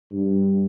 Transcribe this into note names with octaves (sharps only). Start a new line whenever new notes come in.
G2